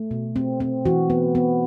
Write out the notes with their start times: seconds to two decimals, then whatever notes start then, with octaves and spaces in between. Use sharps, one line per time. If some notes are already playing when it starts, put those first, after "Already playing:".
Already playing: A3
0.11 B2
0.36 C4
0.60 C4
0.86 E3 F#4
1.10 B3
1.35 B3